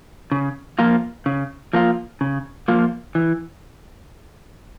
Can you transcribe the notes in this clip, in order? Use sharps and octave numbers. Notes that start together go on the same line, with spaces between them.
C#3
F3 A#3 F4
C#3
F3 A#3 F4
C#3
F3 A#3 F4
E3